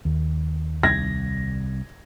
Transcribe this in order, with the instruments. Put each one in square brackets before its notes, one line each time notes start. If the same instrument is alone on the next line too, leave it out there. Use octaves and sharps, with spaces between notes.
[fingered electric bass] D#2
[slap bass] C2 [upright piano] G#6 A#6